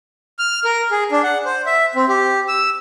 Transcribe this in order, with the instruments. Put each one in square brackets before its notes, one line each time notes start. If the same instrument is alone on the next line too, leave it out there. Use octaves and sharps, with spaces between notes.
[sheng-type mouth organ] F6
A#4
G#4
D4
F#5
C5
E5
C4
G4
E6